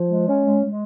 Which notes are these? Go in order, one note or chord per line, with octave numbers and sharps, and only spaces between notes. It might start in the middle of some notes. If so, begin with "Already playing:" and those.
Already playing: F3
G#3
C#4
G#3
G#3